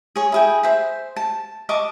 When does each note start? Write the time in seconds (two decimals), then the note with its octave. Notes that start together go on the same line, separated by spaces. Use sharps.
0.16 G#4 C#5
0.32 E4 G#4 G5
0.63 C5 E5
1.16 A5
1.69 D#5 A5 C#6 D6